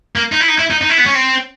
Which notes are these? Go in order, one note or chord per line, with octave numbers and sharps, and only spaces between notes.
A#3
D#4
E4
D#4
E4
D#4
D#4
E4
B3
C#4
C4